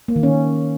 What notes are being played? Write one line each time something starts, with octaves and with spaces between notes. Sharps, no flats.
A#3
D#3
C#4